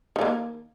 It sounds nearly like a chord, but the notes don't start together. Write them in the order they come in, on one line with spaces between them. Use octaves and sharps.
D#3 F3 A#3